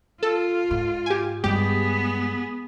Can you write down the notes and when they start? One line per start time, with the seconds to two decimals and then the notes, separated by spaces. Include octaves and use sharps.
0.23 F4 A4
0.71 G#2
1.06 G4 G#5
1.44 G2 G#3 B3 G4 G#4